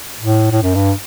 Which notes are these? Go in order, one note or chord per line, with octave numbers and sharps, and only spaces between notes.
A2
A2
F#2
G2